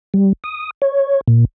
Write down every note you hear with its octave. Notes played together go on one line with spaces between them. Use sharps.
G3
D#6
C#5
A#2